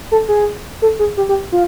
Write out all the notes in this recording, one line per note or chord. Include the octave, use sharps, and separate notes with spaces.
A4
G#4
A4
G#4
G4
G4
F4